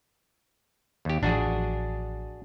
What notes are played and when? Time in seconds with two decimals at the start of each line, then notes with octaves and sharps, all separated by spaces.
1.05 D#2 G4
1.23 A1 F3 D4 F#4 G#4